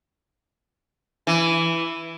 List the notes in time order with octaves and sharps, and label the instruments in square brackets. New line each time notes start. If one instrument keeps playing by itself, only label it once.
[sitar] E3